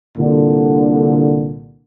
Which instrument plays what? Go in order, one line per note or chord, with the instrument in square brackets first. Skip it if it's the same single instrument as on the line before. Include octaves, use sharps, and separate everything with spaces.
[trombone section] C2 A#2 D3